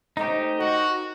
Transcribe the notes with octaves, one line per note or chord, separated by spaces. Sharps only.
A3 C4 C#4 D#4 G4 D#5
D#3 F#4